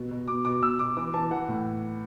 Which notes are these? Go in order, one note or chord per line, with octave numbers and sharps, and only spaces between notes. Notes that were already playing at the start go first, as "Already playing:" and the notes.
Already playing: B2
B2
B2 D6
B2 D6
B2 E6
B2 D6
E3 D6
E3 A5
E3 F#5
A2